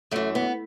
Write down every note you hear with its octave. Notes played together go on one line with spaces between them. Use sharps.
F#2 E3 A3
B3